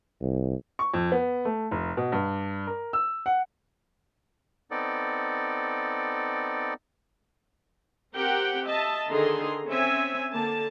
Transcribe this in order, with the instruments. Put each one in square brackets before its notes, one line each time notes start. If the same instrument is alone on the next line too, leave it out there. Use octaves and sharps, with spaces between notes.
[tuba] C2
[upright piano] C#6
F2
B3
A3
F1
B2
G2
A#4
E6
F#5
[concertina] B3 C4 D#4 A4 D5
[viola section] C4 G4 A#4 F#5 G5
D#5 E5 A5
D3 D#3 G#4 A4 A#5 C6
C4 C#4 E5 G#5
D3 A#3 A5